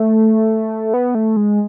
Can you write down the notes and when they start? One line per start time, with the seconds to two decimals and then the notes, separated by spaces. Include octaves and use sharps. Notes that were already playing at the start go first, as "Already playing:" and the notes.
Already playing: A3
0.94 B3
1.15 A3
1.37 G#3